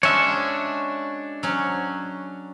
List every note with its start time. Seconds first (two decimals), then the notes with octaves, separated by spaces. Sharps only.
0.03 G#3 C#4 D4 F#4 C#5 E5
1.43 F#3 C#4